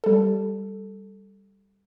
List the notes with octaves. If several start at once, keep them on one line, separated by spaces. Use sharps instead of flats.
G3 A4